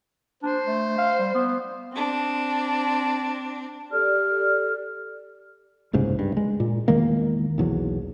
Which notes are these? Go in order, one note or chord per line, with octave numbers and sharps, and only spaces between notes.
D4 C5
A3
F5
G3
B3
C4 D4
G4 A4 D5 F6
F#1 C2 G#2 C#3
G2
G#3
A#2
E2 D#3 G#3 A#3
B1 E2 F#3